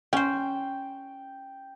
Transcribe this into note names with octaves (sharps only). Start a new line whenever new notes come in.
C#4 C5 G5